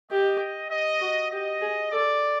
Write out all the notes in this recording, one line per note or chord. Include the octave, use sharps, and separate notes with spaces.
G4 D#5
D#5
F#4
G4 D#5
G#4
A4 D5